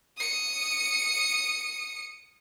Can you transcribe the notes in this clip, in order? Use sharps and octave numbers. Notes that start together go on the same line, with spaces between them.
D#6 C#7